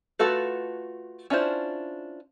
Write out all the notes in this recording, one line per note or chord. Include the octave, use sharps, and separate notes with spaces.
A3 F4 F#4 A4 B4
C#4 D4 E4 F4 C5